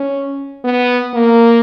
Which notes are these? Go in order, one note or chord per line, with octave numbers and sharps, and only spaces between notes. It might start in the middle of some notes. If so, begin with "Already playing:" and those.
Already playing: C#4
B3
A#3